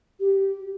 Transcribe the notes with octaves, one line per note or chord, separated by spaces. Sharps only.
G4